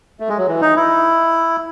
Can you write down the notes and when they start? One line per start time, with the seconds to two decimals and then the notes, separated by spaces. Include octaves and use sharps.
0.20 A3
0.29 G#3
0.38 F#3
0.47 E3
0.61 D#4
0.76 E4